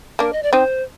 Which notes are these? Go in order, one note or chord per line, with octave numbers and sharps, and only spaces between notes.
A#3 D4 A#4
D#5
D5
C4 D#4 C5